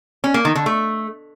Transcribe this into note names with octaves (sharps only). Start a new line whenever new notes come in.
C#4
A#3
D#3
D3
A3